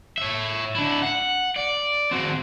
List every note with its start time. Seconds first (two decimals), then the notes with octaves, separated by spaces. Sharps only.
0.18 C#5 E5
0.75 D4 E4
1.02 F#5
1.56 D5
2.11 C4 F#4